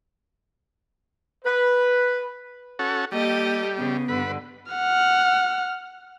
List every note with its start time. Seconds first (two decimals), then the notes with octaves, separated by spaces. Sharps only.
1.45 B4
2.79 C#4 F#4 A4
3.12 G3 A#3 G4 A4 D#5
3.77 C#3 B3
4.08 G2 D3 B4
4.72 F#5 F6